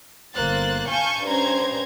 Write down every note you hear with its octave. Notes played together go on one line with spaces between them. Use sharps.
G1 A#3 C5 F#6 A6
F5 G#5 A5 C#6 G6
G2 C#4 C5 A#5 G#6